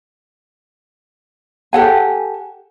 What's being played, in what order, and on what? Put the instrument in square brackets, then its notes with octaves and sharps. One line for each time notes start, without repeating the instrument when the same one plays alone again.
[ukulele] G4 A4 F#5 G#5